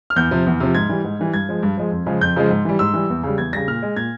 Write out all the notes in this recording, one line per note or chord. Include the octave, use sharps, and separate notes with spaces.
F6
E2 G6
C3 F3
E2
C3 F3
G#2 G#6
E3 G3
G#2
E3 G3
G2 G#6
F3 G#3
G2
F3 G#3
F2
C#3 F3 G#3
F2 G6
C#3 F3 G#3
G#2
E3 G3
G#2 E6
E3 G3
E2
C#3 G3
E2 G#6
C#3 G3 A#6
A#2 F6
G#3
A#2 G#6